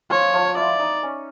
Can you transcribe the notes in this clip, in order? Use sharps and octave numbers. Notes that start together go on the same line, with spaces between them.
F3 F4 C#5
F3 F4
E4 D5
D#4
C#4